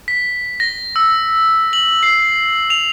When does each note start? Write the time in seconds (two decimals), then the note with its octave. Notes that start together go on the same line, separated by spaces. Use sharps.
0.08 B6
0.60 A#6
0.96 E6
1.73 F#7
2.03 C7
2.70 F7